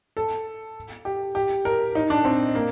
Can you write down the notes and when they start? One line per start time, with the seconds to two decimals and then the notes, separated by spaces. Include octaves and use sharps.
0.17 A4
1.05 G4
1.35 G4
1.65 A#4
1.95 D#4
2.10 D4
2.25 C4
2.55 A#3